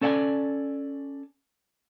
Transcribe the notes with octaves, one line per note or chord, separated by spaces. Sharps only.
C#4 A4 D5 F#5 G#5